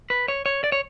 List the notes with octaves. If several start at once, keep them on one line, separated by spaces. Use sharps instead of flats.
B4
C#5
C#5
D5
C#5